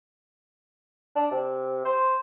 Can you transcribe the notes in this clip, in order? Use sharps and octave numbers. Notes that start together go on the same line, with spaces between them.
D4
C3
C5